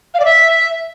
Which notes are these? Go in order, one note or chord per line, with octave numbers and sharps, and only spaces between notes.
F5
D5
E5